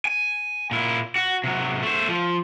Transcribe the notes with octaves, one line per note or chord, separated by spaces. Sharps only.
G#5
A#2 E4
F#4
C3 F#3
A3 C5
F3